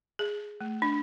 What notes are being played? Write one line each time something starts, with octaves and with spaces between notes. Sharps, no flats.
G#4
A3
D4